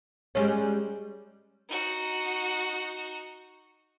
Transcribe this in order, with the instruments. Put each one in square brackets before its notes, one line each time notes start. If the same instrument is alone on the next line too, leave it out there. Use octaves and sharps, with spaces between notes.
[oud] G3 G#3 C#4
[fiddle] D#4 F#4